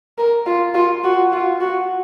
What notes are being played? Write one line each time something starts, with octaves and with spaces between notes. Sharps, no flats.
A#4
F4
F4
F#4
F4
F#4